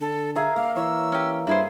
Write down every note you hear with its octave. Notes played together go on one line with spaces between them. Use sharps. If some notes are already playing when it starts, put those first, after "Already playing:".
D3 A4
G#4 A#4 E5 F5
A#3 F5
E3 C#5 E6
C#4 G4
G2 E4 G#4 B4 C5